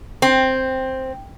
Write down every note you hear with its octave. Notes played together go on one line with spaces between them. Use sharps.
C4